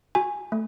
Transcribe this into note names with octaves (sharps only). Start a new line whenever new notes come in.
F#4 G#5
A3